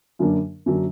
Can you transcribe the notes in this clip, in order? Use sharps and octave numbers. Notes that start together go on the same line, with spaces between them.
F#2 D3 F#3 A#3 D4
F#2 D3 F#3 A#3 D4